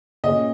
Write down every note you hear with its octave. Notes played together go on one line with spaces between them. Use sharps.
A#2 A#3 C#4 G#4 D#5